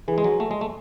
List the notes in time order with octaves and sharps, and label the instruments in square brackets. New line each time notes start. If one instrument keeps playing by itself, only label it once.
[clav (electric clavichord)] E3 [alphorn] G#4
[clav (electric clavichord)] G#3
F#3
A3
G#3
A3